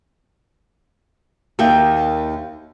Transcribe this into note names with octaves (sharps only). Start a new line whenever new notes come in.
D#2 D#3 E5 G5